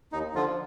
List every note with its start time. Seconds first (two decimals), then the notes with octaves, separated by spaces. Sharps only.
0.12 D#2 D#4
0.35 D3 F3 F4